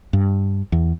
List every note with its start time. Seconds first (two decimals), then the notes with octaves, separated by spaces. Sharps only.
0.13 G2
0.72 E2